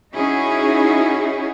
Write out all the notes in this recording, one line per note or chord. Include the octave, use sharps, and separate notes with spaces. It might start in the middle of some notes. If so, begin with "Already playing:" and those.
C#4 D#4 E4 F#4 G#4